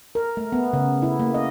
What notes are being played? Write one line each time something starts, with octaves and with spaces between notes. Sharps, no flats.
A#4
A3
B3
C#3
E4
A#3
D#5